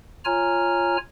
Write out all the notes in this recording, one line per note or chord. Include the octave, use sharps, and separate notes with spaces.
F4 C#5 G#5 A#5 F6